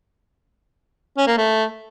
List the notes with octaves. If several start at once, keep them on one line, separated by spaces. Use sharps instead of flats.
C#4
A#3
A3